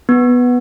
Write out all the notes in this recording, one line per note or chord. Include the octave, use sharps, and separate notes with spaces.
B3